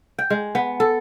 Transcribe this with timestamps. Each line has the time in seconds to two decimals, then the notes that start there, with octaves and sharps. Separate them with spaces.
0.19 G5
0.30 G#3
0.55 B3
0.80 A4